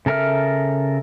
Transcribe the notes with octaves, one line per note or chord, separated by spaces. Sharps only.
C#3 A4 A#4 E5 F6